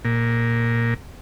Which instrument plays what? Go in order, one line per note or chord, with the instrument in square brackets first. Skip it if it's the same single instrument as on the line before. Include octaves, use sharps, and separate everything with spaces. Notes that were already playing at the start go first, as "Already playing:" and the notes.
[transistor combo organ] A#2